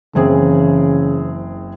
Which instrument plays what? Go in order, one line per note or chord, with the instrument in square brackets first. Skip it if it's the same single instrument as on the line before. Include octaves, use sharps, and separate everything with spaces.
[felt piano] F#1 C4 G#4 [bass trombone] C#3 [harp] E3